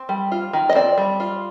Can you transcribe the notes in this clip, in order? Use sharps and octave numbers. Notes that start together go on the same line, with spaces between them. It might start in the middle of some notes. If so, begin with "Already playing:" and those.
Already playing: C4
G3
F4
D#3
D#5
C4 D5
G3
F4